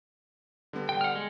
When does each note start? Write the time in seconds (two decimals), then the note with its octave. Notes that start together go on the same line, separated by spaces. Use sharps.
0.73 D3 G3 B3
0.89 G5
1.01 F#5 F6
1.15 G#3